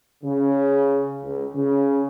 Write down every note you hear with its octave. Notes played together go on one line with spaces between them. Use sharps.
C#3
C#2
C#3